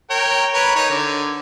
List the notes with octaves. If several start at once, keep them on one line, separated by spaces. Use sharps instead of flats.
A#4 C#5 G5
A#4 B4 C#5
D#4 C#5
D3